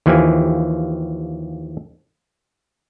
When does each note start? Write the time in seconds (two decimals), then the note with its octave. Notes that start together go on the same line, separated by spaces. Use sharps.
0.06 D#2 E3 F3 A#3 G4 G#5